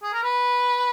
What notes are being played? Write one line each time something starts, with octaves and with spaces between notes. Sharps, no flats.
G#4
A#4
B4